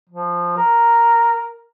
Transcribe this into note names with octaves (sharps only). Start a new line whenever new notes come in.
F3
A#4